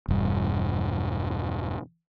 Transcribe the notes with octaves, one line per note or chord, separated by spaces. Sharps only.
E1 G2